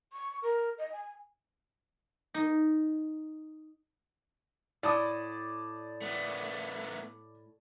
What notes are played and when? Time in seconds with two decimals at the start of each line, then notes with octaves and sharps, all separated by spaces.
0.13 C#6
0.43 A#4
0.78 D#5
0.92 G#5
2.34 D#4
4.83 A2 D5 A5 D#6
6.02 A3 B3